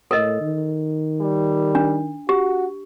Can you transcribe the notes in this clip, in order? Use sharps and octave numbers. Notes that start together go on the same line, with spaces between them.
A2 A4 A#4 D#5
D#3
G3
D4
F#4 G4